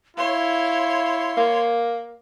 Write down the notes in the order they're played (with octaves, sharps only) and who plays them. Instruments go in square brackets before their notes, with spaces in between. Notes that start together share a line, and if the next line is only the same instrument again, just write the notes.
[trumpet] E4 [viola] C#5 C6 [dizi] F5
[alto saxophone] A#3